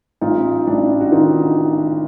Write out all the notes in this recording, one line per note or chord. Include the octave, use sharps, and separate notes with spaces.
A1 D#4 F4
A1 D4 E4
F#4
D#3 D#4 F4